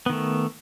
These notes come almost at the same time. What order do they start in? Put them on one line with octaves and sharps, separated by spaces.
B3 D#3 A3